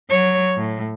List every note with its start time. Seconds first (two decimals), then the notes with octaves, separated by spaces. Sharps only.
0.10 F#3 C#5
0.57 A2